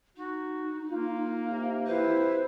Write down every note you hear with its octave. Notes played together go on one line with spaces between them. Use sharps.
D#4 F#4
A#3 F4
C3
E4 B4 C5